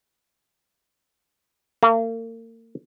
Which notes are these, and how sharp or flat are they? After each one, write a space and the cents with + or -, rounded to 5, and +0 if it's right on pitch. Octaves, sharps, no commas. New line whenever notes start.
A#3 -40